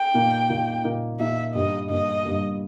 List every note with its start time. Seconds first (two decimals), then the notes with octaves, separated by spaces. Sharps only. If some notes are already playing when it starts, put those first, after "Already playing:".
Already playing: G5
0.14 A#2 A#3 D#4
0.50 A#2 A#3 D#4
0.84 A#2 A#3 D#4
1.20 A#2 A#3 D#4 E5
1.55 G2 G3 A#3 D#5
1.90 G2 G3 A#3 D#5
2.25 G2 G3 A#3